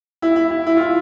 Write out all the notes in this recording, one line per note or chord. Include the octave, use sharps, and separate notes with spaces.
E4
E4
E4
E4
F4
E4